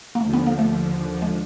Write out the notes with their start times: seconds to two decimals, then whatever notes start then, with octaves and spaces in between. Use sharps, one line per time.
0.15 A#3
0.21 D#2 D3 F3 A3
0.33 B3
0.47 A#3
0.59 A3
1.22 G#3